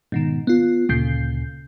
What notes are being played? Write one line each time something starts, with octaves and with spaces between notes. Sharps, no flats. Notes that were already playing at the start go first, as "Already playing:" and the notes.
G#2 B2 D#3
B3 F4
D2 A#2 C#3 G6 C7